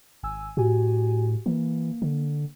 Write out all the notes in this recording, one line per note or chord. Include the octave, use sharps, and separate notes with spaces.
G#1 G#5 E6
A2 F#4 G4 G#5
E3 A#3
D3